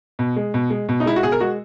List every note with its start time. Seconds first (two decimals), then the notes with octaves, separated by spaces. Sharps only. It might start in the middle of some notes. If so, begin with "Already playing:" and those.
0.19 B2
0.36 G#3
0.54 B2
0.70 G#3
0.89 B2
1.00 D#4
1.06 G#3 E4
1.16 F#4
1.23 B2 G#4
1.32 A#4
1.40 G#3 F#4